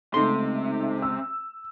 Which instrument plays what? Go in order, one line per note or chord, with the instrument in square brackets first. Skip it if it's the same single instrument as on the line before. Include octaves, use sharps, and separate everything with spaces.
[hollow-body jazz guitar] C#2 C6 [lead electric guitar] C3 [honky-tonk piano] A3 D#4
[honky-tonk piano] E6